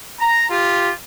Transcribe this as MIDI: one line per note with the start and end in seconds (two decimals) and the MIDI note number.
0.19 0.47 82
0.51 0.90 65
0.51 0.90 67